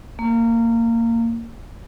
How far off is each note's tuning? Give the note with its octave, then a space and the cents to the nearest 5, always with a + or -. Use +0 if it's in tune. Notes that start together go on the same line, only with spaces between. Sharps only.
A#3 -20